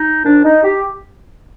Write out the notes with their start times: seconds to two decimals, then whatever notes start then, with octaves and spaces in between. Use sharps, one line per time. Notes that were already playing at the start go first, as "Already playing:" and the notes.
Already playing: D#4
0.25 A#2 F3 D4
0.44 D#4
0.64 G4